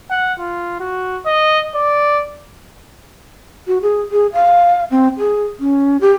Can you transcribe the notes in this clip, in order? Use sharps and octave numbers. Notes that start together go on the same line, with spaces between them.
F#5
F4
F#4
D#5
D5
F#4
G#4
G#4
F5
C4
G#4
C#4
G4